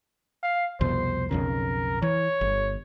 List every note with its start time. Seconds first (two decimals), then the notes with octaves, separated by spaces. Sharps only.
0.43 F5
0.81 C2 F2 B2 C5
1.31 B1 F2 C#3 A#4
2.02 E3 C#5
2.41 G1